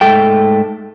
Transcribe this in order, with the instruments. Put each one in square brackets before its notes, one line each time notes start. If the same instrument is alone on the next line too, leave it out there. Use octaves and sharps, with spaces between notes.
[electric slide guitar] G#2 A3 A4 G5